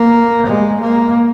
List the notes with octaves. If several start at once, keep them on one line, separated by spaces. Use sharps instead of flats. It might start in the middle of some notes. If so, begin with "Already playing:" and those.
Already playing: A#3
G#3
A#3